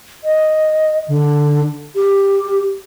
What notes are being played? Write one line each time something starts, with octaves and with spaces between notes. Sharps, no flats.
D#5
D3
G4